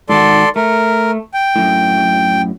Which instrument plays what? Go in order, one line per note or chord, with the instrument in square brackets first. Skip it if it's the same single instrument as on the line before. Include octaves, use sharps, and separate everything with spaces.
[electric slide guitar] G#2 D#3 F#4 [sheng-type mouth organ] A4 D5 C6
[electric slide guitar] A3 [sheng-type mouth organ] A#4
[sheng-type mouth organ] G5
[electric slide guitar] F#2 A2